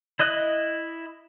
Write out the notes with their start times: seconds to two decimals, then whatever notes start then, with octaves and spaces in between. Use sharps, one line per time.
0.19 E4 D#5 D#6 F#6